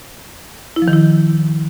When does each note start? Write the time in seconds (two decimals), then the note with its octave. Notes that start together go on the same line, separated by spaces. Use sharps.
0.76 E4
0.82 F3
0.88 D#3
0.93 E4